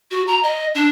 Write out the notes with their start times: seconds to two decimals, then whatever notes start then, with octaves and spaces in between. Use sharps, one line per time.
0.11 F#4
0.27 A#5
0.43 D#5
0.75 D4